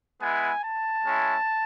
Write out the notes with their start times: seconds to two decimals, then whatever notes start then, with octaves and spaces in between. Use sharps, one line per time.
0.21 G#3 B3 E4 G#5
0.63 A5
1.05 G#3 C#4 E4